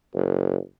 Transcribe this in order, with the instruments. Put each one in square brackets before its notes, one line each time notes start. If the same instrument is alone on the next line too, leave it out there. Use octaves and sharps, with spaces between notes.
[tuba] F#1